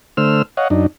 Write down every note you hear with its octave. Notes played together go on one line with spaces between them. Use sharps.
D3 A3 C5 E6 F6
C#5 D#5 F5 F#5
F#2 D4 D#4